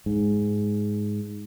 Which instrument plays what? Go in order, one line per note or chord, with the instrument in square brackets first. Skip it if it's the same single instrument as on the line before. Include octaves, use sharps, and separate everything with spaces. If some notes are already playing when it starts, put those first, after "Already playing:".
[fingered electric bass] G#2